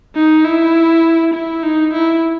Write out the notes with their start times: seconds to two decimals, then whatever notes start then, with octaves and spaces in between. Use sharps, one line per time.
0.16 D#4
0.45 E4
1.33 E4
1.63 D#4
1.93 E4